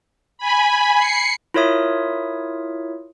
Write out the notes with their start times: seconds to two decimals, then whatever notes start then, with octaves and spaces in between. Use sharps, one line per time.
0.38 G#5 B5
0.96 C7 C#7
1.54 E4 F4 A#4 C#5 E5 D#6